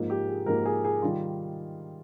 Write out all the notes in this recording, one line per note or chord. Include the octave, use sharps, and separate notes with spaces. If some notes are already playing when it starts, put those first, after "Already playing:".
Already playing: G#2 F3 A#3
G4
G#4
G#2 F3 A#3 A#4
G#4
G#4
D#3 G3 F4